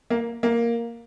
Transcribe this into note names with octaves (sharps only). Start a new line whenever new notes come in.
A#3
A#3